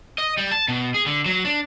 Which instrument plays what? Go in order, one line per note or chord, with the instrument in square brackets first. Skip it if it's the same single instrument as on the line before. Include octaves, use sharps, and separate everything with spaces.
[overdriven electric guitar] D#5
G3
A5
B2
G#4
D3
F#3
D4